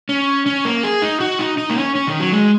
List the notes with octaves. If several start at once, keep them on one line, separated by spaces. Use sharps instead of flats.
C#4
C#4
A#3
G#4
D#4
F#4
D#4
D#4
A#3
C#4
C#4
D#3
F#3
G#3